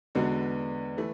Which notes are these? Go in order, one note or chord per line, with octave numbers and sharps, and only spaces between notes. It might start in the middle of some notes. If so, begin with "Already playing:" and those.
E2 D3 G#3 B3 F#4
E3 A3